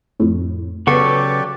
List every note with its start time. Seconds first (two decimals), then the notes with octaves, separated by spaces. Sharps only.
0.20 F2 A2
0.87 C#3 F#3 B3 G4 A4 D5 C#6